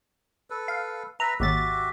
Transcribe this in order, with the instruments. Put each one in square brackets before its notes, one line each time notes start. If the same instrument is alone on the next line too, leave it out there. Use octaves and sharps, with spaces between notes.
[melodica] A4 B4
[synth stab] F5
[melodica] B4 E5 [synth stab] A#5
[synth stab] G#1 D#2 A6 [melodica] F#4 G4 E5